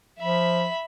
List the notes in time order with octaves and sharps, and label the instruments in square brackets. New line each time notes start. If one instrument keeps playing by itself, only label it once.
[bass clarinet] F3 [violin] E5 B5